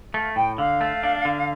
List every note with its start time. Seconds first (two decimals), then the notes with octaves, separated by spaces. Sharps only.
0.14 A3 F5
0.36 A2 G5
0.58 D3 F5
0.81 A3
1.03 D4
1.25 D3